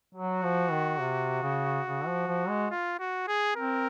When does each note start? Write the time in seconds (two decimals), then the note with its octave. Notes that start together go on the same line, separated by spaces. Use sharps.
0.14 F#3 F#4
0.43 F3
0.71 D#3
1.00 C3
1.42 C#3
1.86 C#3
2.07 F3
2.27 F3
2.49 G#3
2.70 F4
2.99 F#4
3.28 G#4
3.56 C4 A#4